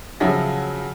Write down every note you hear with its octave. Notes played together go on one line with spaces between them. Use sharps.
C#3 F3 F#3 E5 A#6